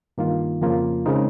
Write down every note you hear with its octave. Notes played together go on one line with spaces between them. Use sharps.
G2 D#3 A#3 F4
F2 C#3 F3 A#3 F4
C#3 G#3 C4 D#4 A#4